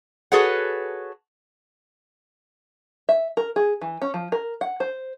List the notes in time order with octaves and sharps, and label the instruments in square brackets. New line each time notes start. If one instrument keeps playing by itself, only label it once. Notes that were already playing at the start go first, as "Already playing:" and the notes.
[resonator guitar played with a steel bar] F#4 G#4 A4 B4 C#5 F#5
[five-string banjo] E5
A#4
G#4
E3
C#4
F3
A#4
F#5
C5